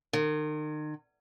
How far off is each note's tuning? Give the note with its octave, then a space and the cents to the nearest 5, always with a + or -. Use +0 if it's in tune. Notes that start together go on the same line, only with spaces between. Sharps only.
D#3 -35